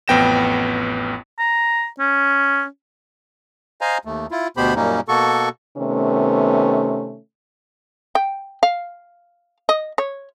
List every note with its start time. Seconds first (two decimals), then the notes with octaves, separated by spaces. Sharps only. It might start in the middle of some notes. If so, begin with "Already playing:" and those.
0.08 A1 F2 B3 G5 A#6 E7
1.39 A#5
1.99 C#4
3.81 C5 D#5 F5 G#5 A#5
4.05 D#2 A3
4.31 E4 F4
4.57 D2 B2 B3 G4 C5 B5
4.76 F#2 A#2 G3 A#3 C#4 D#4
5.08 B2 A#3 F#4 A4 C#6
5.78 C3 D#3 A3 B3 C#4
8.15 G5
8.63 F5
9.69 D#5
9.98 C#5